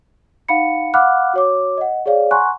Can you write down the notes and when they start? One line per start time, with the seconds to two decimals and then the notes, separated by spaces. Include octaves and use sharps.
0.48 D#4 F5 F#5 B5 C#7
0.94 F5 F#5 B5 D6 F6 F#6
1.33 F#4 C#5 D6
1.78 D#5 F#5
2.06 G#4 C#5 D5 F5
2.31 F#5 G#5 A#5 C6 C#6 F#6